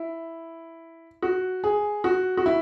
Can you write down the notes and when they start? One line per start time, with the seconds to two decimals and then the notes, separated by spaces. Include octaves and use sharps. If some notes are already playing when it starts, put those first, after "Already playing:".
Already playing: E4
1.22 F#4
1.64 G#4
2.04 F#4
2.37 F#4
2.46 E4